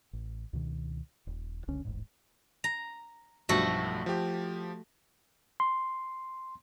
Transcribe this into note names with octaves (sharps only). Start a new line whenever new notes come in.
A1
C#2 B2 D#3
D#1
F#1 C#2 D3 C#4
D#1 A1 G#2
A#5
B1 G2 F3 A3 F#4 A4
F3 G4
C6